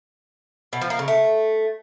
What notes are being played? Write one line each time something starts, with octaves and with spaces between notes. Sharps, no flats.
B2
F3
A#3
C#3
A3